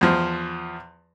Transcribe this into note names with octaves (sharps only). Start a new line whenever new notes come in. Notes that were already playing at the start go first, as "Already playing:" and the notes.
E2 F3